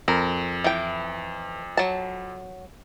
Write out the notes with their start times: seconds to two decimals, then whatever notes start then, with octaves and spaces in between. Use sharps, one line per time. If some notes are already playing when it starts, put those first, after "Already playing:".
0.08 F2 A#4
0.64 E3 G5
1.77 F#3 A5